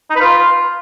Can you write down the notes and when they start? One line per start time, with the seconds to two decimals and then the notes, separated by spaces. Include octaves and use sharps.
0.10 D#4
0.15 B4
0.21 F4